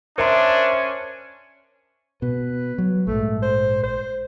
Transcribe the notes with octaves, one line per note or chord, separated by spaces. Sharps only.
C#4 D4 A#4 C5 E5 C6
B2 B4
F#3
A#1 G#2 A3
C5
C5